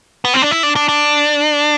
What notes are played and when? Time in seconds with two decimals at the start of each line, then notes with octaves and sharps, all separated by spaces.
0.25 B3
0.34 C4
0.42 D4
0.51 E4
0.63 D4
0.76 D4
0.89 D4